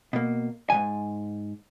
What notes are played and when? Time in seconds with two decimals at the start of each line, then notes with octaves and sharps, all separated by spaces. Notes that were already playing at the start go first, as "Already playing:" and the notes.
0.13 B2 A#3
0.70 G#2 D#3 G#5